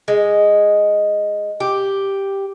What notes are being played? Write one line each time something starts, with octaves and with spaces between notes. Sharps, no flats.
G#3
G4